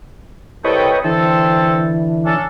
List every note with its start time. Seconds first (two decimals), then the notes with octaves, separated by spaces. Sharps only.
0.65 C2 A4 B4 C#5 D#5 G5
1.04 D3 E3 C4 A4
2.26 C#4 D4 A4